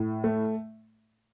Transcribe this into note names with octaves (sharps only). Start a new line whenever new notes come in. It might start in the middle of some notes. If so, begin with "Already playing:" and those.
Already playing: A2
A3